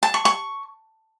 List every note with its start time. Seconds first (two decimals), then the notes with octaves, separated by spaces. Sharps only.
0.03 A5
0.14 C#6
0.25 C#6